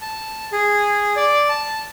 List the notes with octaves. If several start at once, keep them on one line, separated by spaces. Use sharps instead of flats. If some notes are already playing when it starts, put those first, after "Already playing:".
A5
G#4
D5
A5